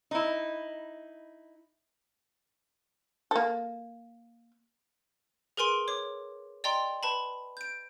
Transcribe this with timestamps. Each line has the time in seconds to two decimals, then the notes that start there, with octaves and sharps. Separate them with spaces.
0.11 D#4 E4
3.31 A#3 A4
5.57 G#4 A#4 B4 G#5 C6 D7
5.88 C#5 D6
6.64 D5 D#5 G5 A#5 C6
7.03 B4 A5 B5
7.57 G6 D7